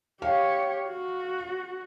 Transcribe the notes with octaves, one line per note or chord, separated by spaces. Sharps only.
G4 C#5 F5
F#4